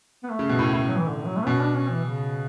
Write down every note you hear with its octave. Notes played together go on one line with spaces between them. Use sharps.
B3
A3
C#3
B2
A2
A2
F#3
E3
D3
D3
F#3
A3
B2 C#4
D4
C#4
E3
C#3